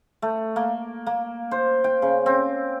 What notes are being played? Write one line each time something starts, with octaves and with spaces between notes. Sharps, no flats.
A3
A#3
A#3
C5
G5
C#3
C4